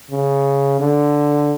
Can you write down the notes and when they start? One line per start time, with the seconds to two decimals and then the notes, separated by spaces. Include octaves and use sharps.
0.11 C#3
0.80 D3